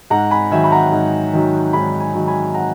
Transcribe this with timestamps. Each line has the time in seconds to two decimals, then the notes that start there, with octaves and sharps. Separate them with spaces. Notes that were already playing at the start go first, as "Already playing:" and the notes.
0.10 G#2 F#5 A#5
0.31 G#5 B5
0.51 D#3 F#3 E5 G#5
0.64 B5
0.72 F#5 A#5
0.92 G#2
1.33 D#3 F#3
1.73 G#2 G#5 B5
2.00 G#5 B5
2.14 D#3 F#3
2.28 G#5 B5
2.54 F#5 A#5